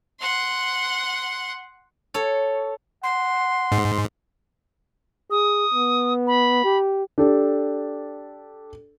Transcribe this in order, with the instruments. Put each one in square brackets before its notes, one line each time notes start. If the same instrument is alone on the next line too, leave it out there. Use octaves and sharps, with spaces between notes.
[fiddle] F#5 C6
[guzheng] A4 C#5
[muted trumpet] F#5 [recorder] C6
[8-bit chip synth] G#2
[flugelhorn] G#4 [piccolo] D#6
[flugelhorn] B3
[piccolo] B5
[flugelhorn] G4
[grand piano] D4 G4 A4